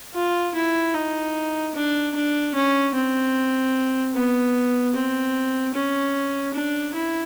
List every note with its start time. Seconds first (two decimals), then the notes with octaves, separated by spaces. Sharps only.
0.15 F4
0.55 E4
0.94 D#4
1.75 D4
2.15 D4
2.55 C#4
2.95 C4
4.14 B3
4.94 C4
5.75 C#4
6.54 D4
6.94 E4